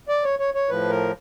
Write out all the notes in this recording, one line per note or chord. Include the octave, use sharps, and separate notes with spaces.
D5
C#5
C#5
C#5
A2 F3 B4
A#4